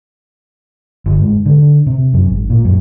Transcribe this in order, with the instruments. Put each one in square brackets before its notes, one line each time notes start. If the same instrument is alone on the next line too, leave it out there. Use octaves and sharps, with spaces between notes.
[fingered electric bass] G1
G#2
D3
C3
F#2
G#1
A#2
F#2